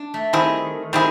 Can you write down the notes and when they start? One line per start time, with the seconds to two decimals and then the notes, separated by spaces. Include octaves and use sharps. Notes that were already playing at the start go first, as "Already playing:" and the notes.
Already playing: D4
0.14 A3
0.33 D#3 G3 C4 E4 G#4
0.93 D#3 G3 C4 E4 G#4